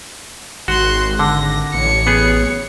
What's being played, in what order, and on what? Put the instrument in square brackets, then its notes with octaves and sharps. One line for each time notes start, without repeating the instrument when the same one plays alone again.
[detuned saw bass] G#1 [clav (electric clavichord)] F#4 [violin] C6 F#6
[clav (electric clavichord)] D3 [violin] A#6
[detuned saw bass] A1 [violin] C#5 C#7
[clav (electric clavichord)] B3 G#4